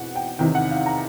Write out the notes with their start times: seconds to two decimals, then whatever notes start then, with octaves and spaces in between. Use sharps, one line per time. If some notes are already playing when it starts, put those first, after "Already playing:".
Already playing: E2 B2 C4 F#5
0.16 G5
0.39 E2 C3 D#3 G5
0.55 F#5
0.71 F5
0.86 A#5